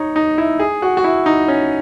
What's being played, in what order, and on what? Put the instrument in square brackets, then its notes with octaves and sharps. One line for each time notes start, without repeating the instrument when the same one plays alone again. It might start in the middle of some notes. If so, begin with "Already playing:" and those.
Already playing: [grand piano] D#4 C#5
D#4
E4
G#4
F#4
F#4
E4
D#4
C#4